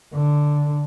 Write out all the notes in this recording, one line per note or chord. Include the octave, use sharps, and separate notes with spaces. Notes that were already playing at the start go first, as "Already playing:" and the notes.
D3